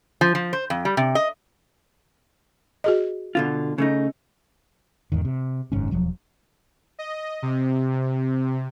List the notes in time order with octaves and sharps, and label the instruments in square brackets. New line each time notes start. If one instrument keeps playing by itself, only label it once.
[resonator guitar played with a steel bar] F3
F3
C5
F2
G3
C3
D#5
[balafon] F#4 G#4 D#5
[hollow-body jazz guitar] B2 D3 F4
C#3 A3 D#4
[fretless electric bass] E2 G#2 D#3
C3
F#1 G#2 D#3 C#4
E1 F3 F#3
[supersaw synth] D#5
C3